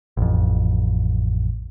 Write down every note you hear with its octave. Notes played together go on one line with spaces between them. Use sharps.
A1 F2